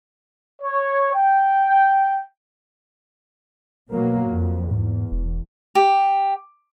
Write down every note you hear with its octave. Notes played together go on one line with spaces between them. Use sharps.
C#5
G5
B2 F#3 A#3
F2
E2 G#2
E1
G4